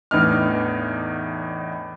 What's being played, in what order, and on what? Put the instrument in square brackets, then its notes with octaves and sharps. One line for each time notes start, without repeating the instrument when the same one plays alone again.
[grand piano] E2 A2 B3 D4 D#4 F6